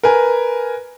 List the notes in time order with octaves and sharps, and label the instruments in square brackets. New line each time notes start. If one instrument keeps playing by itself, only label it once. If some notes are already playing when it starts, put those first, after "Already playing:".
[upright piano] A#4 B4 G#5